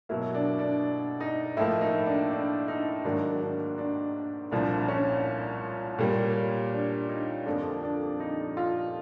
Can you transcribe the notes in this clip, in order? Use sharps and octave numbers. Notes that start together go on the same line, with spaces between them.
B2 F#3 A#3 E4
D4
D4
D#4
A2 F3 A#3 E4
D#4
D4
D4
D#4
G#2 D#3 F#3 A#3 D4
D4
D4
C2 A#2 F3 D4
C#4
A#2 G3 A#3
D4
D#4
F2 D3 F3 A#3 D4
D4
D#4
F4